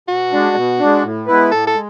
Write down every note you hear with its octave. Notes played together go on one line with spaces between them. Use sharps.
B2 F#4
G#3 D4
B2
G#3 D4
A2
G#3 B3 E4 B4
A2 A4
A4
G#3